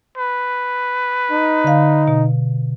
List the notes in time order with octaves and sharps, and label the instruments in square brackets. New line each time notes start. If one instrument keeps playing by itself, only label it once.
[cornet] B4
[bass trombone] D#4
[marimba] D3 F5
B2